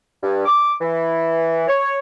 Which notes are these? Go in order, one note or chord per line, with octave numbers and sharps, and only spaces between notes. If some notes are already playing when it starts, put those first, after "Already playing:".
G2
D6
E3
C#5